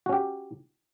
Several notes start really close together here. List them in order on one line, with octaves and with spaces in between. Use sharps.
F#4 C#4 G4